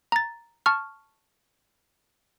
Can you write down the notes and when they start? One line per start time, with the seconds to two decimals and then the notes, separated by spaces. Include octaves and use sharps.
0.12 A#5 A6
0.66 A5 C#6 F6